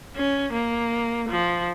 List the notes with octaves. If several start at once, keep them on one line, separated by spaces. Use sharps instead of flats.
C#4
A#3
F3